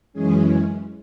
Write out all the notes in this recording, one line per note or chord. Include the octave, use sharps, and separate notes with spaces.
F#2 E3 G#3 C#4 G#4